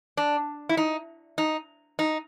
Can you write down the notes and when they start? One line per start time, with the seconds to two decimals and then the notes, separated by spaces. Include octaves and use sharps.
0.17 D4
0.69 E4
0.77 D#4
1.38 D#4
1.99 D#4